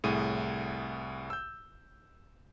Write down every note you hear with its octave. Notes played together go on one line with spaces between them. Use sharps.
C2 A2 G#4 D#7
E6 G6